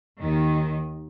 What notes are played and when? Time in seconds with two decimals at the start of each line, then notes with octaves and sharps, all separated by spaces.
0.21 D#2 D#3